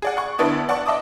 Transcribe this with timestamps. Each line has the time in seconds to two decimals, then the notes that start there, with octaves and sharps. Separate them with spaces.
0.02 G#4 D5 F#5
0.17 F#5 C#6
0.39 D2 D3 B3 D4 E4 D#6
0.69 D5 F#5 A5 C#6
0.86 D#5 E5 A5 D6 D#6